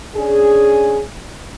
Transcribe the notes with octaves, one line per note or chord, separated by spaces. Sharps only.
C#4 D4 G#4